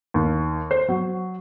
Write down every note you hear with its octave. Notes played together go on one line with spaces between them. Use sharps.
D#2
C5
F#3